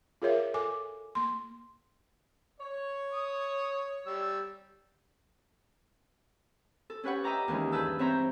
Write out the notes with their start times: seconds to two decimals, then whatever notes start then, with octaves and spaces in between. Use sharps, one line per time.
0.22 F4 G#4 A#4 C#5 E5 F5
0.54 A4 G#5 D6
1.15 A#3 C6
2.60 C#5
3.12 D#6
4.07 G3 E6
6.90 A4
7.03 C#4 G4 B4 C#5 F#5
7.24 D#5 E5 G5 A#5 D6
7.48 D#2 E3 G#3 C#4
7.72 G2 G#4 B4 A5 E6 G6
7.99 E3 C4 C#5 E5 A#5 G6